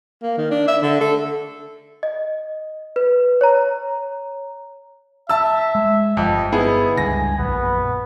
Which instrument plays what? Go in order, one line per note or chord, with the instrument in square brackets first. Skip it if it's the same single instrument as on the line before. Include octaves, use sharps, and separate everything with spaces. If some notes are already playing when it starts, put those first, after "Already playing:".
[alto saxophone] A#3
D#3
D4
E5
D3
A4
[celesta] D#5
B4
C#5 A#5
[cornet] E5 [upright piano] A5 E6
[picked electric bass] G#3
[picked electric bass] G1 [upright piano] F2 [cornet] D#5
[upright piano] B3 E4 G#4
[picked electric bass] C#2 G2 D3 [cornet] G#5 [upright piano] A#6
[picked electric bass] A#1 F#2 [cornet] B3